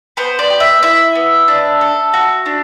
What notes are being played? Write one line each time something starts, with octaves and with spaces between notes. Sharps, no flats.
B3 C5
D5
G4
E5
E4 E5
B3
D4
A4
F#4
D4